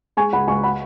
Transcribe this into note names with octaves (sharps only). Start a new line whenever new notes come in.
G#3 G#5 C#6
C#2 F#5 B5
C#2 G#5 C#6
F#5 B5